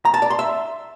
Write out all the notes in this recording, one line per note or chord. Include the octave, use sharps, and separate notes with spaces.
A#5
A5
D5
C6
E5